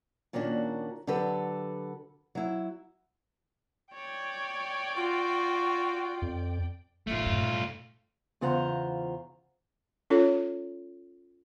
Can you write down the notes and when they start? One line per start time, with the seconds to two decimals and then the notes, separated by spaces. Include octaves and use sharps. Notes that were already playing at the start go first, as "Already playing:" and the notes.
0.33 A#2 D#3 A#3 C#4 D4 F#4
1.07 D3 F#3 G4 A4 B4
2.35 F#3 E4
3.94 C#5 D5 G5
4.97 F4 F#4
6.22 F2
7.07 A1 D#3 A3 F4
7.26 G2 A#2
8.41 E2 C#3 F4 C5 F#5 A#5
10.10 C#4 F4 A4 C#5